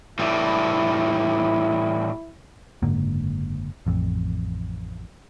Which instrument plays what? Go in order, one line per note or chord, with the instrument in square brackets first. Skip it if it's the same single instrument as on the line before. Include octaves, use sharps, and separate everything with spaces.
[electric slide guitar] A2 E3 G3 [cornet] E4
[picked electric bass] F#1 G#2 D3 A#3
A1 F2